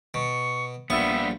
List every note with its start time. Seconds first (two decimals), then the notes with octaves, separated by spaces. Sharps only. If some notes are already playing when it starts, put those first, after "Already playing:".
0.14 B2 C#6
0.90 A#1 G3 B3 E5 C#6